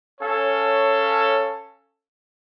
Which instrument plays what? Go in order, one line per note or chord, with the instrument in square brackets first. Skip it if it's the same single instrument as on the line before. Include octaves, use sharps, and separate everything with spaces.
[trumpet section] C#4 A4 C#5 F5